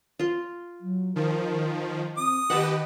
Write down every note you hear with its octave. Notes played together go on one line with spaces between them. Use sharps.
F4 C6
F#3
D#3 F3 A#4
C4 D#6
D#3 G4 B4 D#5 F#5 A5